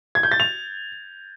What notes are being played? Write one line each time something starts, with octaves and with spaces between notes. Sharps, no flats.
G#6
G6
A6
F7